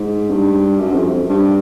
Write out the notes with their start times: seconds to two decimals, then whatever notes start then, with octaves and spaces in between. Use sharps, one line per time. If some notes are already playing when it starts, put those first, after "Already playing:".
Already playing: G#2
0.30 G2
0.79 F#2
0.92 F2
1.29 G2